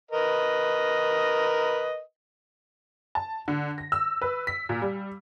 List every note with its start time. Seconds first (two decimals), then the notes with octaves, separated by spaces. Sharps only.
0.11 A#4 B4 D#5
3.15 A5
3.48 D3
3.78 A#6
3.92 E6
4.22 B4
4.47 B6
4.69 A#2
4.82 G3